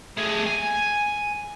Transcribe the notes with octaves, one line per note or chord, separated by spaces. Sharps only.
A3 G#4
G#5